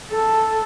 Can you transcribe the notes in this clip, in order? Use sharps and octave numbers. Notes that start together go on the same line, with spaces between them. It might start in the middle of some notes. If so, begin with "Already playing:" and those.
A4